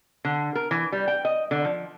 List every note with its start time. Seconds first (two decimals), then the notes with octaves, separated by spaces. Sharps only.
0.25 D3
0.55 A#4
0.71 E3
0.92 G3
1.08 G5
1.25 D#5
1.51 D3
1.65 F3